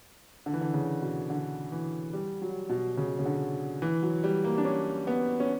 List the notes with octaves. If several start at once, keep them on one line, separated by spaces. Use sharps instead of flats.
D3
E3
D3
C#3
B2
D3
E3
G3
F#3
B2
C#3
C#3
D3
E3
F#3
G3
A#3
D4
C#4
B3
C#4